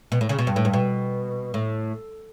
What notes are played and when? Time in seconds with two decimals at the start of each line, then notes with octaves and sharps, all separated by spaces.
0.12 B2
0.21 A2
0.29 C#3
0.39 B2
0.47 G2
0.56 A2
0.65 G2
0.73 B2
1.54 A2